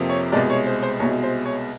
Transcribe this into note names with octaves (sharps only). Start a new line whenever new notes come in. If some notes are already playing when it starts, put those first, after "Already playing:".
Already playing: F2 C3 F3 A#3
C#5
C2 B2 G#3 D5
C#5
C5
C5
C2 B2 G#3 C#5
C5
C#5